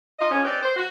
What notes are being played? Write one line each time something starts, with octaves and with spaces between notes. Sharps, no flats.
F4 D#5
F2 F3 C#4
C4 D#4 G4 B4 D5
C5
F#4